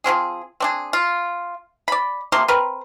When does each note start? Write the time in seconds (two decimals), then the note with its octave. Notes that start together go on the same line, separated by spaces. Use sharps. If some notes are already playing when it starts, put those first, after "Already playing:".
0.04 F3 F#3 C4 G#4
0.60 C4 D4 G#4
0.93 F4
1.88 D5 B5
2.32 C3 F3 A#3 C6
2.48 C4 A#4 B4